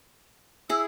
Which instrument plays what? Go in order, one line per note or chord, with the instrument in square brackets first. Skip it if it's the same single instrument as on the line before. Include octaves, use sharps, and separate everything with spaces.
[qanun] E4 G#4 [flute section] E6